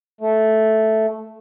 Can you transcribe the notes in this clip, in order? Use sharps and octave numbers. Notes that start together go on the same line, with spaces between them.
A3